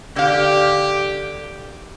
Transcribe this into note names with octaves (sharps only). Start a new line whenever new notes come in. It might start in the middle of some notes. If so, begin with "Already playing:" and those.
D3 G4 F5